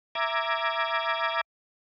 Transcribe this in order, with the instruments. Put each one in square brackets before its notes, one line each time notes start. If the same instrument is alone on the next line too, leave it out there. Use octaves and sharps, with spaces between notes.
[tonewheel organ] E5 A#5 D6 G#6